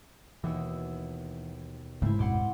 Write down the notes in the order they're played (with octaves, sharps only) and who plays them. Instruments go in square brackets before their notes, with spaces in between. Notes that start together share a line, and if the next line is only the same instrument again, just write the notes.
[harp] D#2 B2 E6 [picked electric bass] E3
[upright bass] G#2 [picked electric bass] C#3 A3 [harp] C4 E4
[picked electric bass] D1 F#2 B2 [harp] F#5 C6 D6